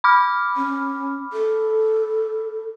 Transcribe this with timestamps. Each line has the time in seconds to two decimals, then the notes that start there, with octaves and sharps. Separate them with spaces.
0.04 B5 D6 F6
0.57 C#4
1.33 A4